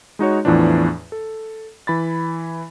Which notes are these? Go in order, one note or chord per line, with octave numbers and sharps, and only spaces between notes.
G#3 D#4 F#4 C#5
E2 A2 E3 F3 D4
A4
E3 B5 A6